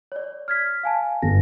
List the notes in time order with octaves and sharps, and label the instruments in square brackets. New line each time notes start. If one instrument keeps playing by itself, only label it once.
[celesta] C#5 D5
F6 G#6 B6
F5 G#5 A5
[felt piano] G1 [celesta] A#6